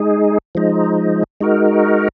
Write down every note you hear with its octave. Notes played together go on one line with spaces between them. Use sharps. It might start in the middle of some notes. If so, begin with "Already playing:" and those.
Already playing: G#3 D#4 G#4
F3 G#3 D#4
G#3 D#4 F#4 A#4